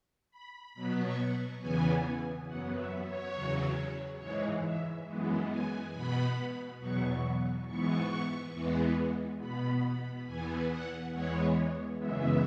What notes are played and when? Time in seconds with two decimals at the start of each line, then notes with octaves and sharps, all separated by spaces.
0.31 B5
0.74 B2 F#3 B3 B5
1.03 C#6
1.60 E2 C#3 E3 B3 G#5
2.47 F#2 F#3 B3 F#5
2.76 E5
3.06 C#5
3.34 E2 C#3 F#3
4.20 G#2 E3 G#3 C#5
4.64 E5
5.07 F#2 E3 G#3 B3
5.51 G#5
5.94 B2 B3 B5
6.80 E2 B2 F#3 B3 C#6
7.66 G#2 E3 B3 C#6
8.53 E2 E3 G#3 B3
9.39 B2 B3 B5
10.27 E2 E3 B3 G#5
10.70 F#5
11.12 E2 E3 G#3 B3 C#5
11.99 F#2 C#3 E3 G#3 B3 E5